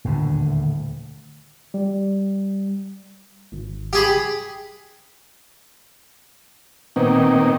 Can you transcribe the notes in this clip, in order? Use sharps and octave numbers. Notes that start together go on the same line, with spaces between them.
D#1 D2 A2 D3
G3
G#1
G4 G#4 B5
A#2 D#3 B3 C4